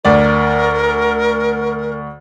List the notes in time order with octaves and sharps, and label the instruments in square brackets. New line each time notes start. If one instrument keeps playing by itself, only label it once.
[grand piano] D2 D5 [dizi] A#4